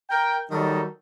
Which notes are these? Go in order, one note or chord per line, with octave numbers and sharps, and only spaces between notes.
A#4 G5
D#3 F#3 G3 D#4 F#4 A4